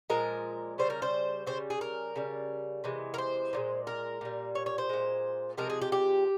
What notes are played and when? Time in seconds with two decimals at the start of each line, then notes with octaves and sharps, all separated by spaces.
0.10 A#2 F3 G#3 A#4
0.78 C#3 G3 C5
0.90 A#4
1.02 C5
1.46 C#3 G3 C5
1.70 G#4
1.81 A#4
2.16 C#3 G3
2.84 C3 E3 G#3
3.14 A#4
3.18 C5
3.53 A#2 F3 G#3
3.87 A#4
4.21 A#2 G3
4.55 C#5
4.66 C#5
4.78 C5
4.89 A#2 G#3
5.58 C3 F3 G#3 A#4
5.70 G#4
5.82 G4
5.92 G4